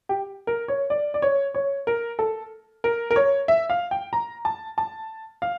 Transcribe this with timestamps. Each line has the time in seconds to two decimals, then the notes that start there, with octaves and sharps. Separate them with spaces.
0.09 G4
0.47 A#4
0.68 C#5
0.90 D5
1.14 D5
1.22 C#5
1.54 C#5
1.87 A#4
2.19 A4
2.84 A#4
3.11 A#4
3.16 C#5
3.48 E5
3.70 F5
3.91 G5
4.13 A#5
4.45 A5
4.78 A5
5.42 F5